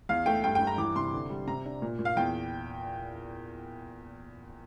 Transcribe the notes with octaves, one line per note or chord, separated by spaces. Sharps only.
E2 F5
A3 G5
G2 G5
G5
G2
A#5
E3 D6
C3 C6
D3
G3
C3 A#5
D4
A#2
A#2
F5
E2 G5